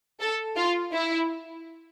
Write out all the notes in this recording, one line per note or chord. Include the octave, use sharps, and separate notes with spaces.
A4
F4
E4